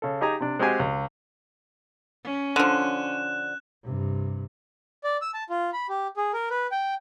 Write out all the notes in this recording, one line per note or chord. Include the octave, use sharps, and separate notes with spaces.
C#3 A4
D#4 G4 G#4 G#5 A#5
C3 D4
G#3 C4 F#4 G4 G#5
C#2
C#4
D3 F3 F#6 E7
G2 C3
D5
E6
A5
F4
B5
G4
G#4
A#4
B4
G5